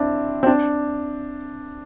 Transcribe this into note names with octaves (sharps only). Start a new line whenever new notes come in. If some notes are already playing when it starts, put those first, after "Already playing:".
Already playing: C4 D4 E4
C4
D4